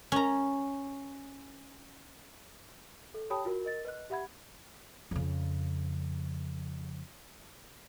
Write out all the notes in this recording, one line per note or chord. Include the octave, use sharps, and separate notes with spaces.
C#4 A#5
A4
G4 C#5 G5 A5 B5 D#6
F4 F#4 A#4
A#4 D#5 A6
B4 D#5 F#6
G4 E5 F#5 B5 G#6
F2 C#3